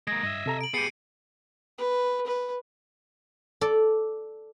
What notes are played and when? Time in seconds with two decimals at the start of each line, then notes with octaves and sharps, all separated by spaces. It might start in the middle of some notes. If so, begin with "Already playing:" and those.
0.07 G#3 A#3 D#6 G#6 A#6
0.23 G2 D#5 E5
0.46 C3 A4 A#5
0.61 D7 F#7
0.74 B3 G4 G#4 C7 C#7 D#7
1.78 B4
2.26 B4
3.61 A4 D5